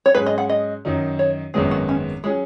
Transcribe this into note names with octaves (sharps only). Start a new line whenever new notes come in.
C#5
G#2 F#3 C#4 G#4 B4
D#5
F#5
D#5
F#2 D#3 F#3 D#4
C#5
G#1 F#2 D#3 G#3 B3 G#4
F#4
C#4
F#3 G#3 C#4 G#4